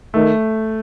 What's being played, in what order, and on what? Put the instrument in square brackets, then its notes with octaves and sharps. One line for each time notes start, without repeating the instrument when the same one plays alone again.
[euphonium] D#3 [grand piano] A3